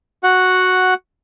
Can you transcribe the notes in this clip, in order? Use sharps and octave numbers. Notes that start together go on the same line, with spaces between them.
F#4 F#5